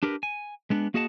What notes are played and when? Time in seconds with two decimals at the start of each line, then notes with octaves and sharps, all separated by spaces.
0.03 D4 G4 A#4 B4
0.23 G#5
0.70 G#3 B3 D4
0.94 A#3 F#4 G#4 D#5 F#5 A5